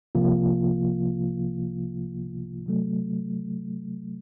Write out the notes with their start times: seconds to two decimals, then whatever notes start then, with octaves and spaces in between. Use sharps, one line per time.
0.15 C2 C3 F3 A#3 F4
2.66 C3 F#3 A3